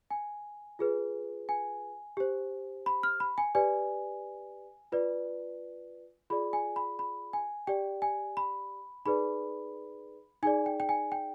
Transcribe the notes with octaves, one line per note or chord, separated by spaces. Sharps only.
G#5
F4 G#4 B4
G#5
G4 C5
B5
F6
B5
G#5
G4 B4 D5 G#5
F4 B4 D5
F4 G#4 D5 B5
G#5
B5
B5
G#5
G4 D5 G5
G#5
B5
D#4 G#4 B4 D5 B5
D#4 G#4 D5 G#5
G5
G5
G#5
G5